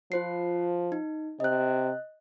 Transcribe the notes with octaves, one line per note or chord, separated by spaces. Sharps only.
F3 F4 C5 C7
D#4
C3 D#5 F#6